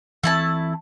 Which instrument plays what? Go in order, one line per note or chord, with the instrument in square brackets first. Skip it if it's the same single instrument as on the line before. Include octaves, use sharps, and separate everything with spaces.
[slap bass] E3 C4 [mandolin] A3 E4 A5